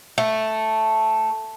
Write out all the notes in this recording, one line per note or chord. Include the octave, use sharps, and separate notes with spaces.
A3